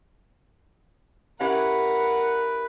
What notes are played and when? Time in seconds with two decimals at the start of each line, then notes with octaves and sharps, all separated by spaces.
1.40 C#4 E4 G4 A#4 B4 F#5